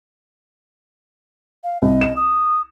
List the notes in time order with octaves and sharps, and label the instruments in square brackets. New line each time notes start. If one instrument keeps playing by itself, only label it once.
[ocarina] F5
[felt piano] C2 [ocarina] D#5
[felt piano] E7
[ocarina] D#6